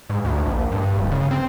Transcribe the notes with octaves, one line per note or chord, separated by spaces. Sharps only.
G#2
D2
A#1
G2
D1
C#3
C4